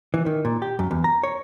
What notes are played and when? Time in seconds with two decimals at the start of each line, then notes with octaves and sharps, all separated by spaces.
0.14 E3
0.26 D#3
0.45 A#2
0.62 G4
0.79 F#2
0.91 E2
1.04 A#5
1.23 C#5